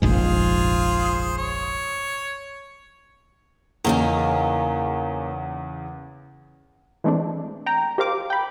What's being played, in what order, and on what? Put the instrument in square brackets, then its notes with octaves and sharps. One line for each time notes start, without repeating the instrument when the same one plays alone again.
[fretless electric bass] F1 A#1 G#2 [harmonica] F4 G#4 C5
[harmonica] C#5
[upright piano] E2 C#3 [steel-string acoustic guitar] A#3 C#4 D#4
[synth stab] E3 G#3 A3 C4 D4
G5 A#5
G4 A#4 C5 F5 D6
G5 B5